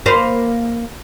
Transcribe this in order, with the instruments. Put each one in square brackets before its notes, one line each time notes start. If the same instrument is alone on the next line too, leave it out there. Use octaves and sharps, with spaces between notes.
[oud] A#3 B4 C5